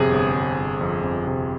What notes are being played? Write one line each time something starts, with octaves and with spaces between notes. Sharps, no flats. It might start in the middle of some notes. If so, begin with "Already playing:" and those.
Already playing: G1 F2 C3 G#4
G1
G1
G1
F2
F2
C3